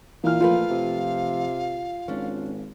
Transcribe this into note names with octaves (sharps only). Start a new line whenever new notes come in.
A#2 E3 F5 F6
F3 A3 F4 B4
C3
G#1 C#4 D4